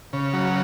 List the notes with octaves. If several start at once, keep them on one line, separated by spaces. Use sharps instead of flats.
C#3
F#3